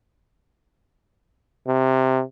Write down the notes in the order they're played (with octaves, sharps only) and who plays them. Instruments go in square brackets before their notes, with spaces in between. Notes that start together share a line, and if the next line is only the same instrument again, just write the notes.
[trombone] C3